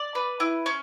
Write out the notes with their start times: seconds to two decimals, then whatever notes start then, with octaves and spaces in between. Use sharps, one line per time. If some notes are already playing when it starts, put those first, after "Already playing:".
Already playing: D5
0.15 B4
0.40 E4
0.66 C#4